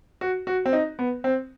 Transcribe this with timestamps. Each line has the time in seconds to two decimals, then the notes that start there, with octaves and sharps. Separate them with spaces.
0.21 F#4
0.47 F#4
0.66 C4
0.73 D#4
0.99 B3
1.24 C4